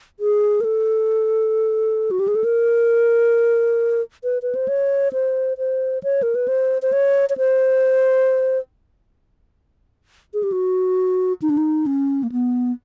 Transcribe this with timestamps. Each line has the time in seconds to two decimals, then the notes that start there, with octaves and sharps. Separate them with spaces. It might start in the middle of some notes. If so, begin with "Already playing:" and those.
0.20 G#4
0.61 A#4
0.64 A4
2.11 F#4
2.20 G4
2.28 G#4
2.35 A4
2.44 A#4
4.24 B4
4.42 B4
4.55 C5
4.68 C#5
5.13 C5
5.58 C5
6.03 C#5
6.23 A#4
6.35 B4
6.48 C5
6.82 C5
6.92 C#5
7.30 C#5
7.38 C5
10.34 G#4
10.43 G4
10.52 F#4
11.42 D#4
11.50 D4
11.57 D#4
11.86 C#4
12.23 A#3
12.32 B3